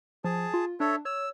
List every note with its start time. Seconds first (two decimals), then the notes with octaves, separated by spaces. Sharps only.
0.24 F3 G#4 A5
0.54 F4
0.80 D4 A4 C#5 E5
1.05 C#5 E6